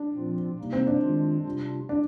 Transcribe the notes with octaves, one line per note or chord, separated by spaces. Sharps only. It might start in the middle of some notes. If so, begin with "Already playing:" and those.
Already playing: D4
A#2 F3 C4 F4
C3 G3 A#3 D#4
C4
D4
D#3 G#3 D4 F4
C3 G3 D4 F4
D4